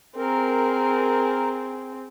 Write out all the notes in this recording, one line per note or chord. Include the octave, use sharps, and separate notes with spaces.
C4 G#4 A#4